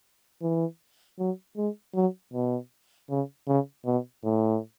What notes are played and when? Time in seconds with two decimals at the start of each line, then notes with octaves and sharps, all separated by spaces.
0.42 E3
1.19 F#3
1.57 G#3
1.95 F#3
2.33 B2
3.10 C#3
3.47 C#3
3.86 B2
4.24 A2